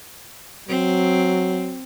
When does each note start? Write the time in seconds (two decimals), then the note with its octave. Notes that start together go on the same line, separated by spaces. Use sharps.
0.68 F#3 C4